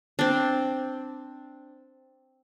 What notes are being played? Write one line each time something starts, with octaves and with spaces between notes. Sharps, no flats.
C4 D4